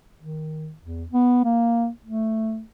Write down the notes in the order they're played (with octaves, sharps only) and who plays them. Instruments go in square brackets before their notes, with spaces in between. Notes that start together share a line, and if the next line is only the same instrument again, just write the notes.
[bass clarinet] D#3
E2
B3
A#3
A3